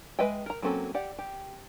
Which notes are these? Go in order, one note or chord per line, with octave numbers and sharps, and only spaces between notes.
G#3 B4 D#5 E5 G5
A#4 A#5
F#3 A#3 C4 C#4 A4
G4 D5 F#5
G4